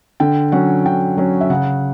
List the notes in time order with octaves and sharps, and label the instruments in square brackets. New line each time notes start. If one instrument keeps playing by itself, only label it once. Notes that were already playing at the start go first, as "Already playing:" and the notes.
[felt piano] D3 G5
F#3 C#4 F#5
D3 G5
F#3 C#4
E5
C#3 F#5